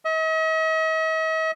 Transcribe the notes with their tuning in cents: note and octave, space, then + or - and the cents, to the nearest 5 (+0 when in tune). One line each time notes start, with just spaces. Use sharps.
D#5 +45